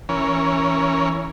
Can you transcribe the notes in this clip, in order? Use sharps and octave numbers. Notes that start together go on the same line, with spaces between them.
E3 C#4 A#4 C#5